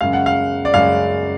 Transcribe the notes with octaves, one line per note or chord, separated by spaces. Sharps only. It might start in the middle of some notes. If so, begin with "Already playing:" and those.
F#2 C#3 G#3 F5
F#5
F5
D5
F#2 C#3 G#3 F5